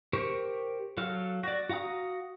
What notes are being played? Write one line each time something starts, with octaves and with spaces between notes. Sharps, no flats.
G4 A#4 C5 C#6
F#3 A4 F5 F6
F#4 D5
F#4 F5 F#5 A#5 D#6